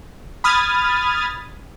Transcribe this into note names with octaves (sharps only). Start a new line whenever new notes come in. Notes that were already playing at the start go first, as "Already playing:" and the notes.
B5 D#6 F6 G#6 A6